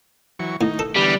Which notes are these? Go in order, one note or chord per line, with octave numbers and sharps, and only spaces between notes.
E3 F#3 C#6
A2 D#3 D#4
A4
D3 E3 G3 B3